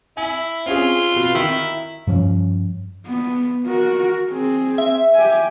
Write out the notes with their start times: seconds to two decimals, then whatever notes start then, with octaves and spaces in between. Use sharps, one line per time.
0.17 E4 G#5
0.66 C4 C#4 F4 G#4
1.16 B2
1.35 D#3 E4
2.07 G2 F3 C#4
3.07 B3
3.66 F#4 A#4
4.30 C4 G#4
4.78 E5
5.15 G4 G#5